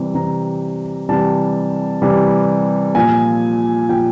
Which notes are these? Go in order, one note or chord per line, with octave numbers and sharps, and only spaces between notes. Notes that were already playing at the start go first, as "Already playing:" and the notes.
Already playing: C3 E3 G3
C3 E3 G3 A#5
C3 E3 G3 A5
C3 E3 G3
A#2 F3 G#5
A#2 F3 G5